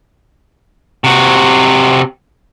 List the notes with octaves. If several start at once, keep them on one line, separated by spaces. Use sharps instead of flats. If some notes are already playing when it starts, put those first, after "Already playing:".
C3 F#4